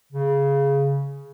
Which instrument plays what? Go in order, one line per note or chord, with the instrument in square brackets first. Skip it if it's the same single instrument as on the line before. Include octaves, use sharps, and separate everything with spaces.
[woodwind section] C#3